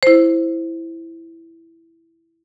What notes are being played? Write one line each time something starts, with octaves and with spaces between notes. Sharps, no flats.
E4 C5